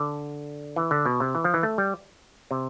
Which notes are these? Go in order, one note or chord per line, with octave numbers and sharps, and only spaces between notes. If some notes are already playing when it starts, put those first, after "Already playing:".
Already playing: D3
E3
D3
B2
C3
E3
F3
E3
A3
G3
C3